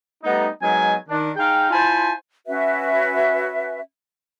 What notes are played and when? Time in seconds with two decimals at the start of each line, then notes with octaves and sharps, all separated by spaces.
0.23 G3 A3 B3 D#4
0.62 F#3 G#3 B3 D#4 A#4 G#5
1.08 D#3 D4
1.37 D#4 G#4 F5 G5
1.71 E4 F4 C5 G#5 A5
2.46 C#4 F#4 B4 E5